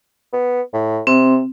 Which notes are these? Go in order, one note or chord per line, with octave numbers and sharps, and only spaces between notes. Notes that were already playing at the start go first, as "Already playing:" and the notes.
B3
A2
C3 C4